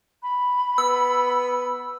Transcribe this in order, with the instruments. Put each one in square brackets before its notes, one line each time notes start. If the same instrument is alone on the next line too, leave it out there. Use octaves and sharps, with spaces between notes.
[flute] B5
[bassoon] B3 [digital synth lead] E6